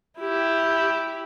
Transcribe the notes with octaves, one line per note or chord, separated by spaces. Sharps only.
E4 G4